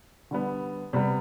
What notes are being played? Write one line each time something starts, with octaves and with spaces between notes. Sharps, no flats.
D3 G3 B3
C3 G3 B3